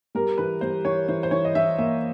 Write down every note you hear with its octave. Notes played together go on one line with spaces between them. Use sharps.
G3 A#4
E3 B4
G3 C5
E3 C#5
E3 C5
C5
E3 C#5
D#5
E3 E5
A#3 E5